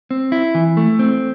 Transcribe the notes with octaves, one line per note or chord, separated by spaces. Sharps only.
C4
E4
E3
A3
C4